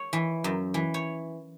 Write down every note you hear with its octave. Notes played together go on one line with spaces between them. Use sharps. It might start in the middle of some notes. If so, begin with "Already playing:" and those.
Already playing: C#5
E3
F#2
E3
C#5